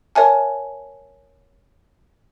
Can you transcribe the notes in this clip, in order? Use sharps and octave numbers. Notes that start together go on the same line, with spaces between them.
A#4 C#5 E5 G#5 A5